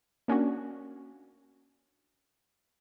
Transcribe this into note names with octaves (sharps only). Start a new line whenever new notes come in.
A#3 C#4 D4 F#4